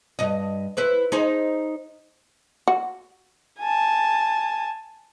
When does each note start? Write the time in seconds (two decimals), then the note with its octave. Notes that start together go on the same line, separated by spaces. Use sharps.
0.19 G2 D#5
0.77 E4 B4 C5
1.12 D#4 G#4 C5
2.68 F#4
3.59 G#5 A5